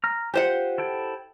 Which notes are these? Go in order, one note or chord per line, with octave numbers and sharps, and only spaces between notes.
A#5 F6
F4 G4 C5 F#5
E4 A4 G5